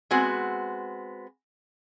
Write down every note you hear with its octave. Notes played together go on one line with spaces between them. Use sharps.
G#3 B3 C4 F#4